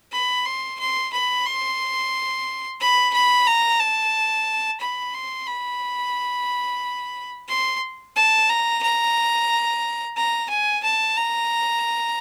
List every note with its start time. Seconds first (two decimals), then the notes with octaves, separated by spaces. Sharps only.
0.12 B5
0.46 C6
0.79 C6
1.13 B5
1.46 C6
2.81 B5
3.14 B5
3.47 A#5
3.80 A5
4.81 B5
5.14 C6
5.47 B5
7.49 C6
8.16 A5
8.50 A#5
8.83 A#5
10.17 A#5
10.50 G#5
10.84 A5
11.17 A#5